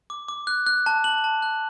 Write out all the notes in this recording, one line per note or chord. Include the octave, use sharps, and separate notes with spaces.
D6
D6
F#6
F#6
A5
F#7
A5
F#6